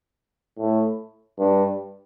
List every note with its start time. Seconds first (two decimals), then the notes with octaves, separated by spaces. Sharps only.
0.58 A2
1.39 G2